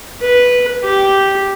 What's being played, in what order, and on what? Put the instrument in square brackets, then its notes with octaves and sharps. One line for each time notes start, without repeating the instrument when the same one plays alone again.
[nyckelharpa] B4
G4